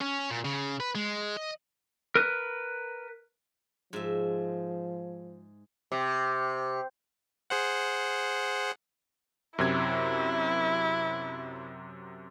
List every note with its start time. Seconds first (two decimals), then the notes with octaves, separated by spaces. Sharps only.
0.01 C#4
0.31 A#2
0.45 C#3
0.80 B4
0.95 G#3
1.37 D#5
2.15 A#4 B4
3.93 G#2 F3 E5
5.92 C3
7.50 G#4 C5 F#5
9.58 F#2 C3 E4 G#6